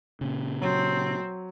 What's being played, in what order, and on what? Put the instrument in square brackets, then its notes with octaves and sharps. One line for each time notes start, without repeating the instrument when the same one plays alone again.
[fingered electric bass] A#2 C#3
[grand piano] F#3 [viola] C4